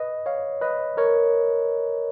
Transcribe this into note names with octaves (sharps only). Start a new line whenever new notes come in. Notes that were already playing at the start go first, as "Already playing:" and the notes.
Already playing: B4 D#5
C#5 F5
B4 D#5
A#4 C#5